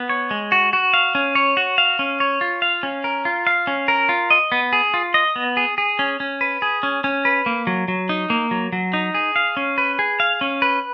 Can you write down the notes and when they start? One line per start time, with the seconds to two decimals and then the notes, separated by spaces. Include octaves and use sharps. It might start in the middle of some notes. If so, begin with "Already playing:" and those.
Already playing: B3
0.09 C#5
0.31 G#3
0.52 F#4
0.73 F#4
0.94 F5
1.15 C#4
1.35 C#5
1.57 F#4
1.78 F5
1.99 C#4
2.20 C#5
2.41 F4
2.62 F5
2.83 C#4
3.04 A#4
3.25 F4
3.47 F5
3.67 C#4
3.88 A#4
4.09 F4
4.31 D#5
4.52 B3
4.73 G#4
4.94 F4
5.14 D#5
5.36 B3
5.57 G#4
5.78 G#4
5.99 C#4
6.20 C#4
6.41 B4
6.62 G#4
6.83 C#4
7.04 C#4
7.25 B4
7.46 A#3
7.67 F#3
7.88 F#3
8.09 D#4
8.30 A#3
8.51 F#3
8.72 F#3
8.93 D#4
9.14 G#4
9.36 F5
9.57 C#4
9.78 B4
9.99 G#4
10.20 F5
10.41 C#4
10.62 B4